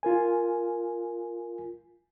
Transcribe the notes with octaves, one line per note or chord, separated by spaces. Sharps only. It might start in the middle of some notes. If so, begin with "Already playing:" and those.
F4 A#4 G#5